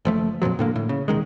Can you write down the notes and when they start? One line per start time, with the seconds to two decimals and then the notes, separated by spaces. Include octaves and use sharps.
0.05 F#1 F3 A3
0.42 F2 A#2 F3 F#3
0.59 A2 D3 A#3
0.76 A2
0.89 C#3
1.08 E1 D#3 G#3